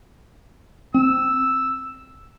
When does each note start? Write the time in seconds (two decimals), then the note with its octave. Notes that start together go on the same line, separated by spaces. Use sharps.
0.94 C4 E6